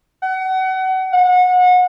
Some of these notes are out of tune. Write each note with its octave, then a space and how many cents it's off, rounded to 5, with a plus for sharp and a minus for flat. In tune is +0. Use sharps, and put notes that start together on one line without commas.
F#5 +30
F#5 -30